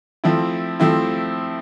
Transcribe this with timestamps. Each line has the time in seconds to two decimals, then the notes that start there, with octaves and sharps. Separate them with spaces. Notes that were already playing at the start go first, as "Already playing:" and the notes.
0.24 F3 A3 C4 E4
0.80 F3 A3 C4 E4